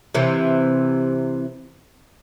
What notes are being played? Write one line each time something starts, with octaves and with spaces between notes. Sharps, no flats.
C3 E3